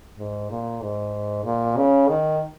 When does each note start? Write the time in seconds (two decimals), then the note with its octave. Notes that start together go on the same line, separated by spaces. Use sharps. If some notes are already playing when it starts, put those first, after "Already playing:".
0.18 G#2
0.51 A#2
0.82 G#2
1.45 A#2
1.77 C#3
2.08 D#3